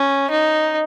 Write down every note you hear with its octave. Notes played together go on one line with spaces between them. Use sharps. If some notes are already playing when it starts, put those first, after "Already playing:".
Already playing: C#4
D#4